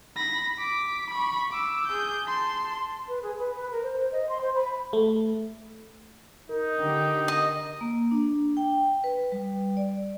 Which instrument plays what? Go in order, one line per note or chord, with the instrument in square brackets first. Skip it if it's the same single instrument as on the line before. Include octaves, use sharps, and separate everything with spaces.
[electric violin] B5 A#6
D6 B6
B5 C#6
D6 E6
G#4 G6
A5 C6
[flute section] B4
G#4
B4
B4
A#4
C5
C5
D#5
C6
C5
B5
[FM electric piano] A3
[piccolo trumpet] D#4 [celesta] A#4
[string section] D3 G4
[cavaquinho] D#5
[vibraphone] A#3
D4
G5
B4
G3
D5